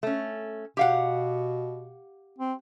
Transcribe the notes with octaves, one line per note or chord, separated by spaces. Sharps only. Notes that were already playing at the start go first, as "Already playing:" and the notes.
A3 C#4
B2 G4 F5 F#5
C4